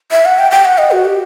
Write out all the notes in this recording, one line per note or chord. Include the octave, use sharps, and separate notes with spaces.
E5
F#5
G5
G5
F#5
D#5
F#4
G4